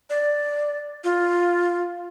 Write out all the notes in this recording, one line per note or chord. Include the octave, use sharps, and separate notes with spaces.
D5
F4